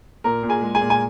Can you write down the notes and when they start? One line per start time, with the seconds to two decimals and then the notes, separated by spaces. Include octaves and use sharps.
0.24 A#2 A#4 A#5
0.43 A#2
0.49 G#4 G#5
0.62 G#3
0.75 G#4 G#5
0.81 A#2
0.90 G#5